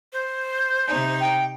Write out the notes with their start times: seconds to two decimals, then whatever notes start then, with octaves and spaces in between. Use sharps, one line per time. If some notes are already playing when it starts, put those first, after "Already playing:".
0.13 C5
0.86 C3 D#4
1.20 G5